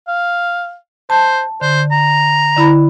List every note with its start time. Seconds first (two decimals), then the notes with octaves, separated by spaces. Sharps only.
0.08 F5
1.10 C5 A5
1.61 D3 C5
1.91 A#5
2.56 D3 E4 B5